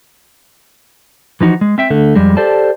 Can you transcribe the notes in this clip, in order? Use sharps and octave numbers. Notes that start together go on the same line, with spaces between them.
E3 F3 D#4 F#4
G#3
C4 E5 G5
D3 A3
F2 G3 G#3
G4 A4 C5 D5 A5